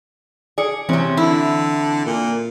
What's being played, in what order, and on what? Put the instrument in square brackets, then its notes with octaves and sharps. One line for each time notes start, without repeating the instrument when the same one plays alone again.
[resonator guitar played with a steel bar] G#4 [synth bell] D5 C#7
[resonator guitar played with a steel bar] C3 C#4 [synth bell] E3 C4
[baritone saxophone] D3 [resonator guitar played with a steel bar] E4
[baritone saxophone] A#2